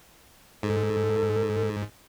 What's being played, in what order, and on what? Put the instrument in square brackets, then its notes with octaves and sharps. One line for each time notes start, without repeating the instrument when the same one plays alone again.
[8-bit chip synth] G#2 [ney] A4